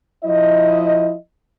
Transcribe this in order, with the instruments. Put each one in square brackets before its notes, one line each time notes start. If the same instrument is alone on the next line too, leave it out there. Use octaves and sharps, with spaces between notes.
[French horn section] F3 E4 D#5